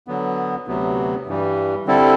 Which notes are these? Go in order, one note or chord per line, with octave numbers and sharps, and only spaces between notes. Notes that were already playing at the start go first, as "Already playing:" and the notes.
D3 F#3 B3
D2 C3 F#3 B3
G2 E3 G3
D3 G3 C4 E4 A4